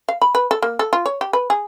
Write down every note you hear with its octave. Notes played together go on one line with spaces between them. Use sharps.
F5
B5
B4
A4
A#3
A4
F4
C#5
G4
B4
G#4